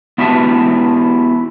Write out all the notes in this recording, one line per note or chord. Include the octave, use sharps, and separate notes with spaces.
B3 E4 F#4 G4 E5 A5